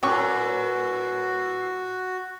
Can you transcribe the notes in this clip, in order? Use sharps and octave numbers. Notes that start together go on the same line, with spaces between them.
F#2 A2 C#4 F#4 G4 B4 C#6